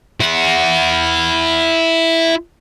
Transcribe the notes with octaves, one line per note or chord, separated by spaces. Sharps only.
E4 F#5